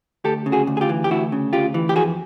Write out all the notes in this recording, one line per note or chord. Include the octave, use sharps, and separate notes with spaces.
D2 G4 A4
C#3
F#4 G#4
D2
G#4
F4 G4
E3
G4
D2 E4 F#4
C#3
D2 F4 G4
E3
G4
F2 F#4 G#4